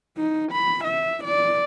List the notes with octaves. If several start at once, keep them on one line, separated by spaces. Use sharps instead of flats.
D#4
B5
E5
D5